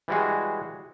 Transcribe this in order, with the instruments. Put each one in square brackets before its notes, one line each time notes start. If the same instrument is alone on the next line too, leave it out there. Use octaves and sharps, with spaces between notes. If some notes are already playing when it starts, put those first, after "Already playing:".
[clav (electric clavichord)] E3 G3 G#3 F#4 G#4